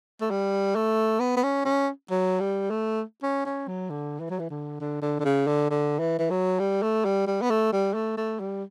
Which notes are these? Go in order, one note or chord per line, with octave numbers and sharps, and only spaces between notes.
A3
G3
A3
B3
B3
C#4
C#4
F#3
G3
A3
C#4
C#4
F#3
D3
E3
F#3
E3
D3
D3
D3
D3
C#3
D3
D3
E3
E3
F#3
G3
A3
G3
G3
B3
A3
G3
A3
A3
G3